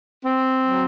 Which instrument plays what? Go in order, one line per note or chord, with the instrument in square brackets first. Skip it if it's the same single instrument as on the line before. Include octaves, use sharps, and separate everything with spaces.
[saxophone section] C4
F#3